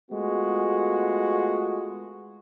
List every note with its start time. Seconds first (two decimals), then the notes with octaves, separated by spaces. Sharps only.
0.11 G#3 A3 B3 F4 F#4